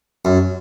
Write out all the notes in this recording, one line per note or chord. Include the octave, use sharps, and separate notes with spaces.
F#2